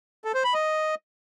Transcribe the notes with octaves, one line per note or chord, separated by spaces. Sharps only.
A4
C5
B5
D#5